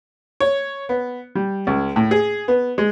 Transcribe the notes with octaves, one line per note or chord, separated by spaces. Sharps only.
C#5
B3
G3
C#2
A2
G#4
B3
G#3